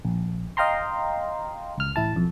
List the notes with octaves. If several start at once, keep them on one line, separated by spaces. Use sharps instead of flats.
A#1
D#5 F5 G5 A#5 C6
C#2 F6
A1 E4 A5
B1 F2